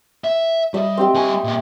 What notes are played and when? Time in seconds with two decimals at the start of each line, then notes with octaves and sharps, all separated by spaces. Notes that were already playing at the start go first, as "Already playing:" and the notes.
0.24 E5
0.74 G3 D#5 E5
0.98 C4 G4 G5
1.15 G3 G5 G#5 C#6
1.44 A#2 E5